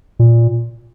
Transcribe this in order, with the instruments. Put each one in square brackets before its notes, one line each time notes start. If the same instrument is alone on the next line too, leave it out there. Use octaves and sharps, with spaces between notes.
[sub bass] A#2